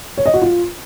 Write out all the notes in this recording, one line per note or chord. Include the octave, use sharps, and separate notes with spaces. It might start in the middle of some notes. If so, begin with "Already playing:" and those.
C#5
D#5
F#4
F4